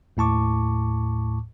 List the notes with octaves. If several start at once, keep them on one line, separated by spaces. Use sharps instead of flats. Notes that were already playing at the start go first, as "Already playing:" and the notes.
D#2 A2 A5 C#6 D6